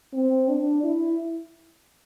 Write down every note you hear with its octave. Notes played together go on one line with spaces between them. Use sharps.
C4
D4
E4